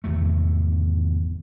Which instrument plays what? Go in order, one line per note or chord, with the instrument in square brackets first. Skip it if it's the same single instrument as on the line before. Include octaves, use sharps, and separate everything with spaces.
[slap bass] G#1 E2 C3 A3